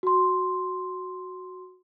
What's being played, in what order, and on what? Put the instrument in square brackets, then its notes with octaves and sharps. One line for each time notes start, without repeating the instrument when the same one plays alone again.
[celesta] F#4 C6